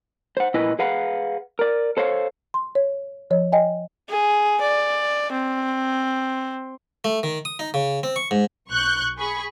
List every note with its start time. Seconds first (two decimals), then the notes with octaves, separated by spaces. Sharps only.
0.37 C5 F#5
0.54 A#2 E4 B4 D#5 G#5
0.79 G#4 B4 F5 F#5
1.59 A#4 D5
1.97 A4 C5 C#5 F5
2.54 C6
2.75 C#5
3.30 F3 C#5 D#5
3.52 D#5 G5 G#5
4.09 G#4
4.61 D5
5.32 C4
7.04 A3
7.23 D#3
7.45 D#6
7.59 D#4
7.74 C#3
8.03 C4
8.16 C#6
8.31 G#2
8.69 B1 C#6 F#6 G6
9.18 G#4 B5 C#6